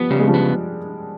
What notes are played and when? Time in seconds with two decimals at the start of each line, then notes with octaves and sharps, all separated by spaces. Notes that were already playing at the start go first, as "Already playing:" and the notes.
Already playing: F3 G3 B3
0.10 C#3 G3
0.20 G#3
0.28 F3 G3
0.34 B3